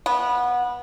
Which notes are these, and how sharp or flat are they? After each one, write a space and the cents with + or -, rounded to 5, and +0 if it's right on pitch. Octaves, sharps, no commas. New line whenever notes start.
B3 -20